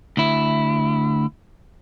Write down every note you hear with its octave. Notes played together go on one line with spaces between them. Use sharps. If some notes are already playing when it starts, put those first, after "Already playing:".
D2 E4